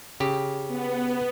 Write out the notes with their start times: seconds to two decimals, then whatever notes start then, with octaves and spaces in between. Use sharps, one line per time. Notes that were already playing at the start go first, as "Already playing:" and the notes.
0.20 C#3 G4
0.68 B3